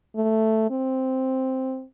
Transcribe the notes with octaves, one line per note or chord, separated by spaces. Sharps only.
A3
C4